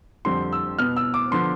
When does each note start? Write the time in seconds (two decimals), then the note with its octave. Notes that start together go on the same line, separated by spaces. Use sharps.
0.25 F2 D3 G3 C4 C6
0.53 E6
0.78 B2 B3 F6
0.97 E6
1.14 D6
1.31 D3 F3 B3 C6